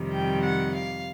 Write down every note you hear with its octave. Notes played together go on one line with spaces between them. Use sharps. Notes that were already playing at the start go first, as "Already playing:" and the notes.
Already playing: F2 C3 D#3 G3
G5
F#5
F5